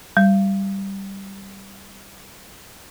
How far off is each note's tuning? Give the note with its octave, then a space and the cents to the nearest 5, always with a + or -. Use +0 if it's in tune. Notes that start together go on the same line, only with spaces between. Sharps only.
G3 +0